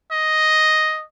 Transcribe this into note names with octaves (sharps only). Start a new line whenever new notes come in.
D#5